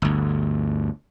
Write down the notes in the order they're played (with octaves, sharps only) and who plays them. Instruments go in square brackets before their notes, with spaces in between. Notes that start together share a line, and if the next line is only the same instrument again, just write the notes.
[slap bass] G1 D2